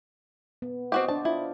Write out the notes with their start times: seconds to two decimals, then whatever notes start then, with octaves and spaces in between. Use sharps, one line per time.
0.62 B3
0.92 C4 F#4 G4 D#5
1.08 D4 C5 D5 A5
1.25 E4 F4